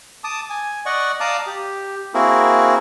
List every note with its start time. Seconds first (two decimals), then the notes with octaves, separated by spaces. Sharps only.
0.24 A5 D6 D#6
0.50 G#5
0.86 D5 D#5 F#5 C#6
1.20 D5 F5 A5 A#5 D6 D#6
1.47 G4
2.14 A#3 C4 E4 F#4 G#4 A#4